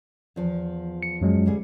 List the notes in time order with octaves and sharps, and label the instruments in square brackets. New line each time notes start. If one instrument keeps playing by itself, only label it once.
[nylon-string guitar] E2 F3
[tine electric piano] C#7
F#2 F#3 G#3
[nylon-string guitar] D2 G3 G#4